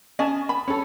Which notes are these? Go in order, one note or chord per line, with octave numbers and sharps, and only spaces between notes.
C#4 D#5 G#5 A5
B5
C#4 A4